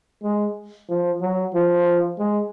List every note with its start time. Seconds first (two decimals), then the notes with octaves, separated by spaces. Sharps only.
0.23 G#3
0.89 F3
1.21 F#3
1.54 F3
2.18 G#3